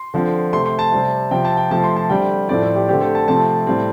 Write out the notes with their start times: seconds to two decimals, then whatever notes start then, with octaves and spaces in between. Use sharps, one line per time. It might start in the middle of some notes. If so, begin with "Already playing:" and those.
Already playing: C6
0.14 D3 F3 C4
0.53 C3 A3 C4 C6
0.66 C6
0.79 A5
0.92 C3 G3 C4
1.31 C3 F3 C4 G5
1.45 A5
1.57 G5
1.71 C3 F3 A3 C4 A5
1.84 C6
1.96 A5
2.10 D3 G3 C4 G5
2.49 A2 F3 A3 C4 D5
2.62 A4
2.75 G4
2.88 D3 A3 C4 G4
3.01 A4
3.15 A5
3.28 C3 F3 A3 C4 A5
3.67 A2 G3 C4